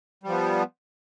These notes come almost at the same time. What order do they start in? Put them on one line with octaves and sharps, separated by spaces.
G3 F3 B3